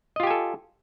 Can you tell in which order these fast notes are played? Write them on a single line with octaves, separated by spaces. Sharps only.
D#5 F4 G4 G#5 A4